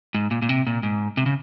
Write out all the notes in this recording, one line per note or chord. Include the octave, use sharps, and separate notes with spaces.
G#2
A#2
A#2
C3
A#2
G#2
C3
C#3